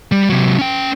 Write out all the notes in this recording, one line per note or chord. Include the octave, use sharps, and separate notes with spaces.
G3
C3 F#3
C#4 G5